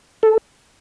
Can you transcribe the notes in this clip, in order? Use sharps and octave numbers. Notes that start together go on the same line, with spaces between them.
A4